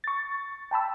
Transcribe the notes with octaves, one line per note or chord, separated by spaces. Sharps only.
C#6 A6
G5 A5 B5 E6